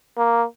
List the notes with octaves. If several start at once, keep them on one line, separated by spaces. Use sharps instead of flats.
A#3